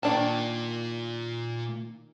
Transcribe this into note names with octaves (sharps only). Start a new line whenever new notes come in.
A#2 D#3 D4 A5